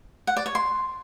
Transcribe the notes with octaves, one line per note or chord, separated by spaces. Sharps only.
F#5
D5
C#5
C6